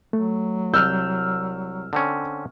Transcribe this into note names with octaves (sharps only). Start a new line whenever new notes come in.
F#3 A3
C2 E6 F6 G6
D3 C4 C#4